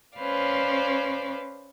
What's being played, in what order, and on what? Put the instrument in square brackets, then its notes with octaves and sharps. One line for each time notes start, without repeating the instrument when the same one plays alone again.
[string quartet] C#4 B4 C5 D5 F5